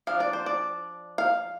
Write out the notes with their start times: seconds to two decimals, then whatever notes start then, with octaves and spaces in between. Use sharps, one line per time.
0.07 F3 D4 F5
0.20 D5
0.33 C5
0.46 D5
1.18 F5